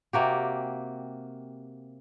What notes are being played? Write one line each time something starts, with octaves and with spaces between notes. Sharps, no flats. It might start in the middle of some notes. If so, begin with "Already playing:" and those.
C3 A#3 F#4 G4